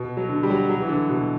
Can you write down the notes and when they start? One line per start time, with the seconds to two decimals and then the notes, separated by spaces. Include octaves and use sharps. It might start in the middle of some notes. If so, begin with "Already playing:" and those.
Already playing: B2
0.17 F#3
0.29 D3
0.43 G3
0.50 F#3
0.70 F#3
0.82 E3
0.89 D3
1.10 B2